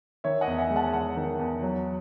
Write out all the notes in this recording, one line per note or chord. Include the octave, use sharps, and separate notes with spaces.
D#3 C#5 E5
D#5 F#5
E2
E5 G#5
G#3
F#5 A5
E2 F#5 A5
D#3
E2
F#3